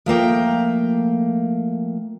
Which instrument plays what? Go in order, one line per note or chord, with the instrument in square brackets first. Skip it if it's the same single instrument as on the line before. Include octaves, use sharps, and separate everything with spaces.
[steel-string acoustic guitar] F3 A3 A#3 G5